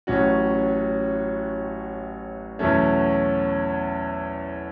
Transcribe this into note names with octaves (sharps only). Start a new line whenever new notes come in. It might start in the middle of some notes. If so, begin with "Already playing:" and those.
A1 A2 F#3 C#4 F#4
E2 B2 F#3 A3 C#4